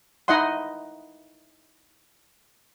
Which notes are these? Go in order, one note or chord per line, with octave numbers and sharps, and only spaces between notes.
D#4 E4 D#5 F#5 C6